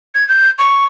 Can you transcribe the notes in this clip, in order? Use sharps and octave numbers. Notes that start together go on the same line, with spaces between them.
G#6
G6
C#6